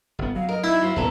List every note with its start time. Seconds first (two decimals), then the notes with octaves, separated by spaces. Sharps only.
0.19 G1 B3
0.36 F#3 F5
0.49 A#4 D#5
0.64 D#4 E4 G#6
0.81 F#3 F4 C5 E5
0.96 D#2 A#2 B3 C#4 A4 A#5